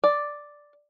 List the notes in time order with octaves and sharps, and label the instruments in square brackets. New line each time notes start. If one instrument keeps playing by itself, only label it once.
[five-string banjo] D5